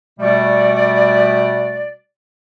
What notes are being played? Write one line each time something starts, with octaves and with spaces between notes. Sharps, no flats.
B2 G3 A3 F#4 D5